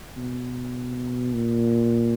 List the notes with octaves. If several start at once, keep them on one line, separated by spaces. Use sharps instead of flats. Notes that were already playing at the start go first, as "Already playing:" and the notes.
B2
A#2